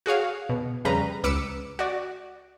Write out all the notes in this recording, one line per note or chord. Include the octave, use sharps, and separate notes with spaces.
F#4 G#4 C#5 F5
B2
F2 C#3 G3 B4 A#5
C#2 B4 D6 E6 C#7
F#4 D5